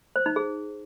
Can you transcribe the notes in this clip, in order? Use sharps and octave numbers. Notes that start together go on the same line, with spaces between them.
C5
D#4
G#4